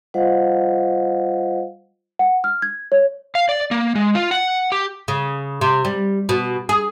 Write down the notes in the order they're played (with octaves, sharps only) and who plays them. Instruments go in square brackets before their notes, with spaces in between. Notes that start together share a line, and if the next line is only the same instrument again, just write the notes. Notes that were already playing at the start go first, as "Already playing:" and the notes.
[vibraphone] G3 F4 C5 D#5 F5 F#5
[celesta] F#5
F6
G#6
C#5
[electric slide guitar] F5
D5
A#3
G#3
F4
F#5
G4
[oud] C#3
C3
G3
B2
G#4